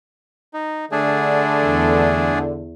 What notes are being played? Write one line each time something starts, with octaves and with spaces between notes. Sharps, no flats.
D#4
D3 A3 D4 G#4
E2